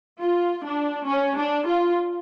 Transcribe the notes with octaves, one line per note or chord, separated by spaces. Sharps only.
F4
D4
C#4
D4
F4